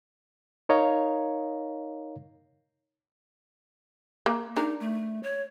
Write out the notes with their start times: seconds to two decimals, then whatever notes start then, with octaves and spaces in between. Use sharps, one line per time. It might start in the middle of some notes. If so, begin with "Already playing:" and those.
0.69 D#4 A#4 C#5 D#5 F5 A#5
4.26 A#3
4.56 D4 D#4 A#4
4.80 A3
5.23 C#5